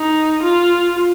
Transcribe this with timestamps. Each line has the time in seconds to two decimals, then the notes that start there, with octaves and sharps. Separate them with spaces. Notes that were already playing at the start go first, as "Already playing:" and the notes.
Already playing: D#4
0.43 F4